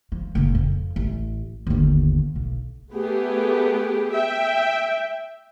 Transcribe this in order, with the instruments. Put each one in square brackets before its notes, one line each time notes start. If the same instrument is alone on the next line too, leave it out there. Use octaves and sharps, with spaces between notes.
[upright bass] F3
F#1 A#2
F2
A1
G1 D#2
B1
[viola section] A3 B3 G4 G#4
E5 G5